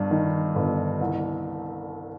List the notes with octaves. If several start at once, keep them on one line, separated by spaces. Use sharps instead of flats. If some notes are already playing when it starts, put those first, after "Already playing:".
Already playing: G1 G2
D#3
G1
C2